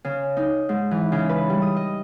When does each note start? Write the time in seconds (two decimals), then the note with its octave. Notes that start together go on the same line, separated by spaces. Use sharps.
0.05 C#3
0.37 D#4
0.69 G#2
0.91 E3
1.12 C#3
1.29 B4
1.50 G3
1.62 D#6
1.77 D#5